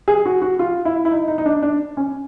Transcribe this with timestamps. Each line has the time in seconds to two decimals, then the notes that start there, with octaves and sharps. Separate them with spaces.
0.08 G#4
0.26 F#4
0.42 F#4
0.59 F4
0.85 E4
1.05 E4
1.11 D#4
1.28 D#4
1.38 D#4
1.46 D4
1.62 D4
1.97 C#4